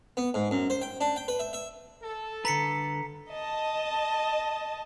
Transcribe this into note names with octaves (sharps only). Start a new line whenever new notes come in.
B3
G#2
F#2
C5
G5
D4
G5
B4
E5
E5
A4
D3 B4 A#5 B6 C#7
D#5 A5